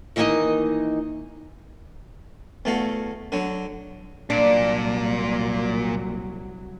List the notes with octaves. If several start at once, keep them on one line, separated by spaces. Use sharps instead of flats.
D#3 E3 A#3 D4 D#4 D#5
E2 A3 F#4 F5
D3 F#3
C2 A#2 F#3 D4